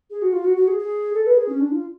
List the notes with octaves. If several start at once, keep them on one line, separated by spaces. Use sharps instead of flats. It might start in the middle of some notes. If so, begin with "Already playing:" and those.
G#4
F#4
F4
F#4
F#4
G#4
G#4
A4
B4
G#4
C#4
D4
F4